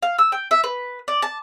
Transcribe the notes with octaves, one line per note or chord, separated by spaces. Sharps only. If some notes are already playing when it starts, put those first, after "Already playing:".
F5
E6
G5
E5
B4
D5
A5